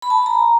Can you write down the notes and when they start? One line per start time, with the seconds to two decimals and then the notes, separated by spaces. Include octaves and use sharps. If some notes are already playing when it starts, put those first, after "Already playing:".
0.02 B5
0.10 A5
0.18 B5
0.26 A#5